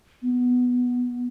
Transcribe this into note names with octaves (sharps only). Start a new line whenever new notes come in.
B3